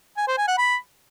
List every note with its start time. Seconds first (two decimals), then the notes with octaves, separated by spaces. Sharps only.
0.17 G#5
0.27 C5
0.37 G#5
0.48 F#5
0.58 B5